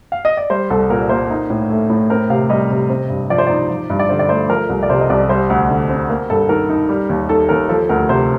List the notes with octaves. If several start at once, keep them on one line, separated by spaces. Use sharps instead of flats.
F5
D#5
D5
G3 C5
C2 A4
A#2 A#4
A#3 C5
D#4
A2
A3
A2
C4 A#4
C3 F5
G3 D#5
C3
C4
G2
F3 D5
C5
D#4 D5
F3
G2
D5
D3 C5
D5
A3 C5
F3 A#4
C2
D5
C3 C5
D#5
C2 D5
G3 C5
D2
D3
C4
A#3
G2 A4
D#3 A#4
D#4
G3
D#2
D#3 A4
D#2 A#4
F3 A4
D2 A#4
C3 C5